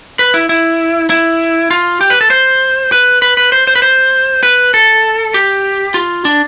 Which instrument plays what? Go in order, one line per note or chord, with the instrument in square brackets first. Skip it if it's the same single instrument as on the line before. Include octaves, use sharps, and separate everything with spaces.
[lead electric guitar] B4
E4
E4
E4
F4
G4
B4
A4
C5
B4
B4
B4
C5
C5
B4
C5
B4
A4
G4
F4
D4